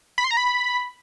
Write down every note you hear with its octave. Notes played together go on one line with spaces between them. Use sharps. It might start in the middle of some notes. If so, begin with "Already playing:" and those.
B5
C6
A#5
B5